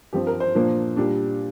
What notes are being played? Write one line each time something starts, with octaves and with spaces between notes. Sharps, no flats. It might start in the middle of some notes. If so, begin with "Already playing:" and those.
G2 F3 C4 G4
A#4
C5
A#2 F3 A#3 D4
A#2 G3 D4